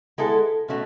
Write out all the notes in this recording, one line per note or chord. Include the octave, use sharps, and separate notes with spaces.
G#3 B3 E4 A4
B2 A3 C#4 F#4